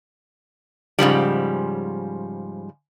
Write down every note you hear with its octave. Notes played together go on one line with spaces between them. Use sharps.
G#2 C#3 F3 G3